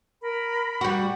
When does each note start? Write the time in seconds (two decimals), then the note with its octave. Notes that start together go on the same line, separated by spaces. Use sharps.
0.21 A#4 B5
0.81 G3 F#4